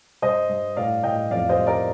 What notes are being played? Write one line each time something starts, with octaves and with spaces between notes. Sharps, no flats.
G2 C5 D#5
G2
A2 D5 F5
A2 D#5 G5
F2 D5 F5
C5 D#5
G3
A#4 D5